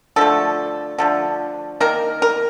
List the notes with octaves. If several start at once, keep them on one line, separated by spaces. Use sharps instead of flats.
D3 F3 A3 A4
D3 F3 A3
D#3 A#3 A#4
A#4